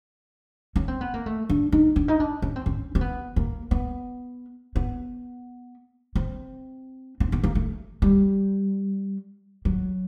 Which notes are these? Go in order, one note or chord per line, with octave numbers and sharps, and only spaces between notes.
C#4
C4
B3
A#3
A3
D4
D#4
D4
D#4
D4
C#4
C4
C#4
C4
B3
A#3
B3
B3
C4
C4
B3
A#3
A3
G3
F#3